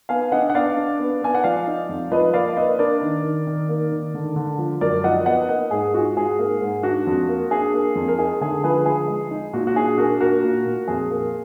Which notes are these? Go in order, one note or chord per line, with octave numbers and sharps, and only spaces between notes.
B3 F5 G#5
D4 D#5 F#5
F#5
B3 D5 F5
D4
B3
B3 G#5
F#5
F3 D5 F5
D#4
F2
F3 B4 D#5
A#3 D5 F5
A#3 B4 D#5
D4 A#4 D5
D#3
D#3
D#3
A#3
D#3
D3
D3
F3
F#2 A#4 D5
F3 D#5 F#5
B3 D#5 F#5
A#3 D#5 F#5
G#2 G#4
F4 F#4
G#2 G#4
A#3
G#2
D4 F#4
F2
A#3
D4 G#4
A#3
F2
A#4
D#4 G#4
D3 G#4
F3 G#4 B4
F3 G#4
G#3
D#4
A#2 F#4
F#4
D4 G#4
D4 F#4 A#4
A#2 F#4 A#4
A#2
A#2
F2 G#4
A#3